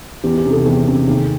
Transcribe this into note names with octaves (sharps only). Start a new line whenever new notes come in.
E2 G4
G4
C3 D#3
A4
E2 G#4
C3 D#3
D#2